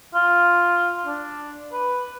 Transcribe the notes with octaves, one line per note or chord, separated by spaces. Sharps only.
F4
D4
B4